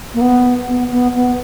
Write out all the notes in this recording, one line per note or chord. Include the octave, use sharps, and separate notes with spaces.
A#3
B3
B3
B3
B3